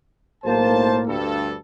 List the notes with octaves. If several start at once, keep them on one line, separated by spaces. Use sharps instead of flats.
B1 A2 A#3 C5 A5
D2 G2 A4